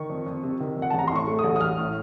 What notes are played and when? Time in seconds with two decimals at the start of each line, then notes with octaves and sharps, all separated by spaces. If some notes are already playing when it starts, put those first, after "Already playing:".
Already playing: D#3 C#6
0.10 F2
0.26 F2
0.43 C3
0.60 D#3
0.77 F2
0.82 F#5
0.90 A5
0.94 A1 A#5
1.08 A2 C6
1.16 C#6
1.27 A3
1.39 D#6
1.44 A1
1.56 D#6
1.60 A1 F6
1.78 A2